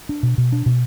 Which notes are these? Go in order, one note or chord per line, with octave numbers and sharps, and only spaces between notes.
D4
B2
B2
D4
B2